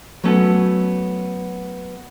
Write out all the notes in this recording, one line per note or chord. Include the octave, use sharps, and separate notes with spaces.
F#3 A3 B3 C#4 A4